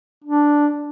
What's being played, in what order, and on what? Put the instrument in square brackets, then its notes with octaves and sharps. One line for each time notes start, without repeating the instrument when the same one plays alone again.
[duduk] D4